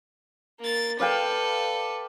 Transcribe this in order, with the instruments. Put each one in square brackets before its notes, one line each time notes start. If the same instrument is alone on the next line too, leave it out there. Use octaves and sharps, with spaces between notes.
[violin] A#3 A6
[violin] A4 B4 [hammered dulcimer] D5 F5 G5